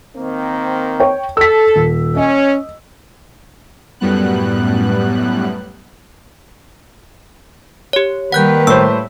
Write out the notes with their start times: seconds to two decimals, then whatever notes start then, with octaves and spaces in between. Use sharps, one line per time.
0.16 D#3 A#3 C4
1.00 C#5 G5
1.37 A4 E6 B6
1.75 D#1
2.16 C#4 D#5
4.00 F#2 A2 G3 B3 F#6
7.93 G4 C#5
8.32 D#3 G3 A#3 B4 F#5 F#6 G6
8.67 A2 C5 E6